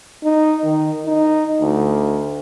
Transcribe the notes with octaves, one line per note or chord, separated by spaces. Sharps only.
D#4
D#3
D#4
D2